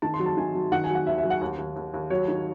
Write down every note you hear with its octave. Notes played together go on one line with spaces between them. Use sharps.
D#3 A5
C6
F#3
A5
D#3 G#5
F#3
D#3 F#5
G#5
F#3
F#5
D#2 E5
E5
F#3
F#5
D#2
D#2
D#2
D#2
F#3 C#5
D#3